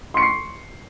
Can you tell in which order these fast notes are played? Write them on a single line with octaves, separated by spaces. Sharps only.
C6 C#7 C#6 C7